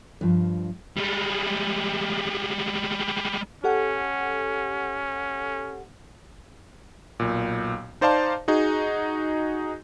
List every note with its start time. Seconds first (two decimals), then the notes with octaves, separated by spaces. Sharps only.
0.21 G2 F3
0.97 G3 G#3
3.64 C#4 G4 A4 F#5
7.20 B1 A#2
8.01 D#4 C5 D5 F5 A5 C6
8.48 D#4 F#4 G#4